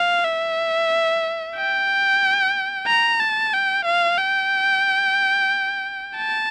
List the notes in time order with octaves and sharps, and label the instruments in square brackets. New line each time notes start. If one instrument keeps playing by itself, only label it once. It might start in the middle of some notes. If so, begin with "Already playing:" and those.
Already playing: [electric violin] F5
E5
G5
A#5
A5
G5
F5
G5
A5